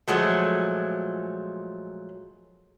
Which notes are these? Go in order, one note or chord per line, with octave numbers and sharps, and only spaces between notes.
A#2 F3 F#3 G#3 A3